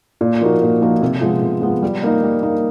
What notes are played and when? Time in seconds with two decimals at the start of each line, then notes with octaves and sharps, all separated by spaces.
0.21 A#2
0.41 F3 A#3 D#4 F#4
0.62 A#2
0.82 F3 A#3 D#4 F#4
1.02 C3
1.21 F3 G#3 B3
1.42 C3
1.62 F3 G#3 B3
1.83 G3
2.03 A#3 D#4
2.23 G3
2.43 A#3 D#4